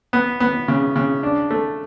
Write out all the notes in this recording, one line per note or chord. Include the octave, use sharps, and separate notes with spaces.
B3
B3
C#3
C#3
D4
A3